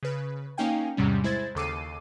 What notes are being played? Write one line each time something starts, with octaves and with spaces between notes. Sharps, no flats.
C#3 B4
A#3 C#4 D#4 F5 G5 G#5
E2 G#2 C3 G3 C#4
G#3 E4 C5 G#6 A6
D#2 C#3 A4 D6 C7 D#7